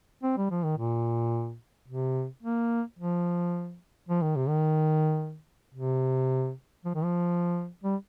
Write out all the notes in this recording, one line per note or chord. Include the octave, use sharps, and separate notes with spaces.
C4
G3
F3
D#3
A#2
C3
A#3
F3
F3
D#3
C3
D#3
C3
F3
D#3
F3
G3